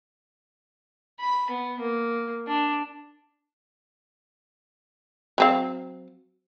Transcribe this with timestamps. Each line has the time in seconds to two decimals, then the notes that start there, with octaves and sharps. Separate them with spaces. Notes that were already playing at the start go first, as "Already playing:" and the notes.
1.20 B5
1.50 B3
1.80 A#3
2.48 D4
5.38 F#3 C4 F5